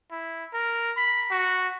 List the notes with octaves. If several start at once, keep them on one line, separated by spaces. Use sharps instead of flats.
E4
A#4
B5
F#4